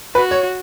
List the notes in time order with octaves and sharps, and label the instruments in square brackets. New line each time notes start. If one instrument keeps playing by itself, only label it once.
[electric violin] F#4 [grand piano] B4
[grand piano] C#5